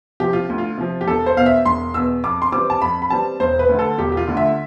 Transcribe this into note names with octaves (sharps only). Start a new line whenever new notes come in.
C3 F3 G4
F4
D2
F4
C3 F3
G4
E1 A4
C5
E2 B2 F5
E5
E1 C6
E2 B2 E6
F2 D6
C6
E3 G3 C4 D6
A5
F2 B5
B5
E3 G3 C4 A5
E1 C5
B4
D2 D3
A4
E1 G4
G4
F4
D2 D3
E5